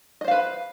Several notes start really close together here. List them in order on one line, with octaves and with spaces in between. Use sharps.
D#5 C5 F5 B4